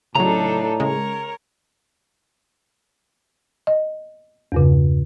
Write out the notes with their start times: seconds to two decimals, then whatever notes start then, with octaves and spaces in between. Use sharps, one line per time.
0.15 A2 C#3 F#3 D4 D#4 A4 A#5
0.80 C#3 G#3 A#4 C#5
3.67 D#5
4.52 E2 G2 C#3